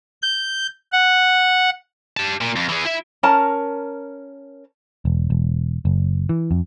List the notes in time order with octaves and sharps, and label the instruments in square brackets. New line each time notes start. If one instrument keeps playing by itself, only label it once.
[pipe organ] G6
F#5
[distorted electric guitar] G4 A5
A#2
F2
E3 G#4
E4 E5
[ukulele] C#4 A#4 A5 A#5
[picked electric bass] E1
E1
F#1
E3
F2